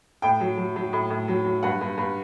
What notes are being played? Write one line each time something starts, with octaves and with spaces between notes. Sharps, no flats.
A2 G5
F#3
F#3
F#3
A2
A2
F#3
F#3
G2 F#5
G2
G2